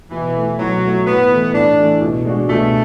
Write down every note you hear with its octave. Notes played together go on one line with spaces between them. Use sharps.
B2 E3
A3 E4
B2 F#3
A3 E4
A2 B3
E3 A3
A2 D4
E3 A3
B2
G#3 D4 F#4
B2 A3